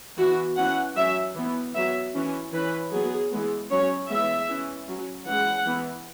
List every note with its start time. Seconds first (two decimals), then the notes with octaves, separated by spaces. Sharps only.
0.18 E3 B3 F#4
0.57 E3 C#4 F#5
0.97 F#3 C#4 E5
1.36 E3 B3
1.75 F#3 B3 E5
2.15 E3 C#4
2.53 E3 C#4 B4
2.92 F#3 B3 G#4
3.32 E3 G#3 B3
3.70 F#3 C#4 C#5
4.10 E3 G#3 B3 E5
4.49 E3 C#4
4.88 F#3 C#4
5.26 E3 G#3 C#4 F#5
5.66 E3 B3